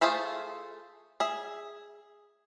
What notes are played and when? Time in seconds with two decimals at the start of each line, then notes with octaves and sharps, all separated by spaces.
0.01 A3 F4 G#4 C5 E5
1.20 G#4 E5